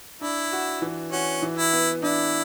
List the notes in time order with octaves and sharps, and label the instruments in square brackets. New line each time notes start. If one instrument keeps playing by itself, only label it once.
[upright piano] D4 [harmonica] E4
[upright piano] F#4
E3
[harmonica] C#4 [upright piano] F#4
[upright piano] E3
[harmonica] E4
[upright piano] B3
[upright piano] D4 [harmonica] E4